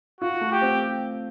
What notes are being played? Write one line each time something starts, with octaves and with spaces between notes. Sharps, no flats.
F4 F#4
A3
G4
C4